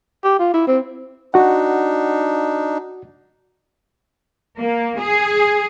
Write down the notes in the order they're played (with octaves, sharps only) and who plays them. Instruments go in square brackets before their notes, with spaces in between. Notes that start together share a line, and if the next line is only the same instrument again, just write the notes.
[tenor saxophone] G4
F4
E4
C4
[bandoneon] D4 D#4 [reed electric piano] F#4 F#5
[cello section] A#3
G#4